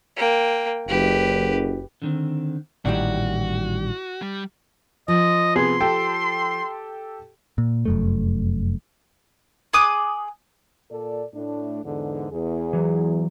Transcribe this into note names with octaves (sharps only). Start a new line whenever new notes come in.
A#3 G5
F#1 G4 B4
D3 D#3 C4
A1 A#2 D#3 G3 E4 F#4 D5
G3
F3 D#5
C3 B3 G#4 C6
G4 A4 G5
A#2
F1 F#2 A3
G#4 D6 D#6 F#6
A#2 A4 D5
A2 A3 D4
E2 G#2 D3
E2 G#4
E3 F#3